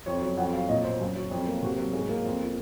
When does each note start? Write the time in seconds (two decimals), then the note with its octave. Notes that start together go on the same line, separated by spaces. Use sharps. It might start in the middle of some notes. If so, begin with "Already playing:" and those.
0.06 F2 C#5
0.17 C#5
0.22 F#3
0.37 F2 F#5
0.53 F#3 F5
0.69 A#2 D#5
0.84 A#2 C5
1.00 F#2
1.16 F#3
1.31 F2
1.47 A#3
1.62 C3 F#4
1.78 F#3
1.93 G#2 G#4
2.09 A#3
2.25 F2
2.41 F3